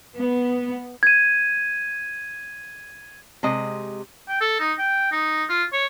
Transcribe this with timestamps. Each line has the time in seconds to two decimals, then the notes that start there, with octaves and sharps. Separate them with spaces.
0.16 B3
1.03 G#6 D#7
3.43 C3 G#3 D#5
4.29 G5
4.41 A4
4.60 D#4
4.79 G5
5.12 D#4
5.49 F4
5.73 C#5